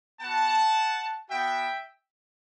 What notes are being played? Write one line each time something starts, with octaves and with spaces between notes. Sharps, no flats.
B3 F#4 F#5 A5
B3 F#4 E5 G5